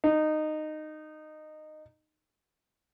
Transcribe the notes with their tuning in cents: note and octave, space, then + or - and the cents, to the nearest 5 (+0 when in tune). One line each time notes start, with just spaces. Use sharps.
D#4 -15